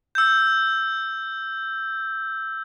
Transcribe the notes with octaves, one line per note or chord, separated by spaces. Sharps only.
E6 G6